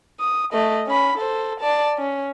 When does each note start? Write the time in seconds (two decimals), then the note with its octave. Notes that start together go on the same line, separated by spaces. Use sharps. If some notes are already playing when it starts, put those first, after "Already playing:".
0.20 D#6
0.53 A3 D#5
0.87 C#4 B5
1.18 A4 C5
1.60 D5 A5
1.98 C#4